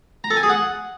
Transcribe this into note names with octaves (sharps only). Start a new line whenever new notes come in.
A#5
A4
G#5
G#4
F#5